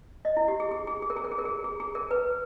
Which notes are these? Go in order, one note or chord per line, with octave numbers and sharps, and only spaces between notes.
D#5
E4
G4
G#4
G#4
G#4
G#4
A#4
G#4
A#4
G#4
A#4
G#4
G#4
G#4
A#4
B4